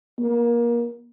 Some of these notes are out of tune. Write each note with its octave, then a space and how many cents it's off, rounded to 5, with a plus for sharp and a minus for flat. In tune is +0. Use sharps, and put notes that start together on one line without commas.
A#3 +25